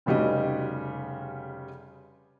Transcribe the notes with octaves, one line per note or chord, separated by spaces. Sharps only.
F1 C#3 G3 F#4 D#5